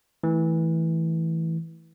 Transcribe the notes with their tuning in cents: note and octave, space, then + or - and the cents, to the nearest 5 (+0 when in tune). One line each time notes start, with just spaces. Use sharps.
E3 -15 A3 +0